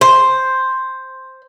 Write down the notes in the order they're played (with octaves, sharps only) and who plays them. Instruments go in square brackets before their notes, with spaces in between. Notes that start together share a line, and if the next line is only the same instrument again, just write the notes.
[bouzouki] C5